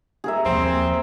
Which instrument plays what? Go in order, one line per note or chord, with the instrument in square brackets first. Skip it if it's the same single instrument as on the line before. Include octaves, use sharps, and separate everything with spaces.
[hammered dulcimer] G#4 A#4 E5
[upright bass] D#2 F3 [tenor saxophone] C4